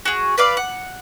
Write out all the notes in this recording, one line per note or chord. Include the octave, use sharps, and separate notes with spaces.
F#4 G#4
B4 D5 F5 D6
F#5